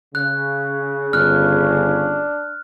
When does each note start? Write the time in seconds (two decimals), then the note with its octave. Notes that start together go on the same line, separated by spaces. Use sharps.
0.15 C#3 F#6
1.13 G1 D4 F6 F#6